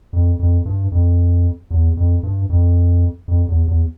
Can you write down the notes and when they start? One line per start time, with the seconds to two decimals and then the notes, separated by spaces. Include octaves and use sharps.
0.13 F2
0.39 F2
0.65 G2
0.92 F2
1.71 E2
1.97 F2
2.23 G2
2.50 F2
3.28 F2
3.48 E2
3.68 E2